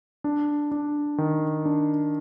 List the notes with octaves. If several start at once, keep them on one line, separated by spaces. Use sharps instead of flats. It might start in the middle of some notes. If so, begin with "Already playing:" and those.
D4
D4
D#3
D4